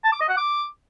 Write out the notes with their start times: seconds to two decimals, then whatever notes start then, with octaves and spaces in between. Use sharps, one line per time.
0.04 A5
0.13 D6
0.21 D#5
0.29 F#5
0.37 D6